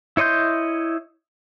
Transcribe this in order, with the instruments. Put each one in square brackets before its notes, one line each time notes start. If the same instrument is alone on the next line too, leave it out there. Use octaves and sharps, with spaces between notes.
[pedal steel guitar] E4 C#5 D#5 C6 G6